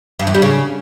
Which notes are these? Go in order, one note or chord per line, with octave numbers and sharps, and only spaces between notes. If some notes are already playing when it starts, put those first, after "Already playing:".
G2
E2
G3
C#3